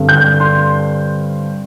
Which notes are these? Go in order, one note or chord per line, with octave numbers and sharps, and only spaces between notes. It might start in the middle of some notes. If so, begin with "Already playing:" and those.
Already playing: G2 D3 G3 C4
G6
C6